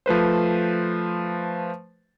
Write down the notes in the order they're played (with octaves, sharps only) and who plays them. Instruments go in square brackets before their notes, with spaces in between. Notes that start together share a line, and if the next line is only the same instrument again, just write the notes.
[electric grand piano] F3 A3 B4 C5